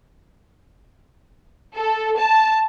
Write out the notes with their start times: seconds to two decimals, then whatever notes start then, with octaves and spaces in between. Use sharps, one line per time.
1.75 A4
2.17 A5